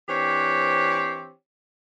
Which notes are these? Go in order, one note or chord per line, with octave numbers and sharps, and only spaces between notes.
E3 C4 D4 G4 C5 C#5